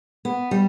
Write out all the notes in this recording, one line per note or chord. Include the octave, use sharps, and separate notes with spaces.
B3
G3